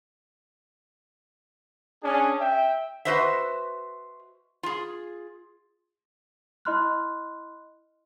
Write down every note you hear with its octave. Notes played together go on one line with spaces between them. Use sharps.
C#4 D4 G#4
E5 G5
F#4 B4 C5 D#5 E5
F4 G#4
E4 D#5 B5 C6 F6 F#6